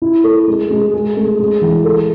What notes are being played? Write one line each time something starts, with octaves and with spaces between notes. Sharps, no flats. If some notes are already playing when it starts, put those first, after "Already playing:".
E4
A4
G#3
G#3
G#4
A3
G#3
E3
A4